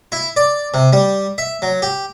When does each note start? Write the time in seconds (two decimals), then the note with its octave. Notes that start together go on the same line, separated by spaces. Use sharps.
0.12 E4
0.36 D5
0.74 C3
0.93 G3
1.38 E5
1.62 F#3
1.82 G4